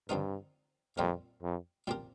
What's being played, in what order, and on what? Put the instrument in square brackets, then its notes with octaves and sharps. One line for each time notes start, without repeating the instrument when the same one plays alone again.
[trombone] G2 [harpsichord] D3 F3 C4 D#4 A#4
[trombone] F2 [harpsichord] A#2 G3 C4 F4 A#4
[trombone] F2
[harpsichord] A#2 F3 C4 G4 A#4